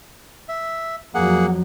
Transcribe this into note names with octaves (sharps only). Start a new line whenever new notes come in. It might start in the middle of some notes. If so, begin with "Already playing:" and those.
E5
F2 F#3 A#3 G#4 F#5